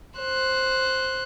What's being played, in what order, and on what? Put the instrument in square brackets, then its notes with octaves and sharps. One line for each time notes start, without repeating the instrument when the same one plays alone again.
[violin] C5 F#6